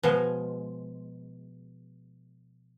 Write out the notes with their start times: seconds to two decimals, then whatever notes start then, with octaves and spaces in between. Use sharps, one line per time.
0.03 B2 F3 G#3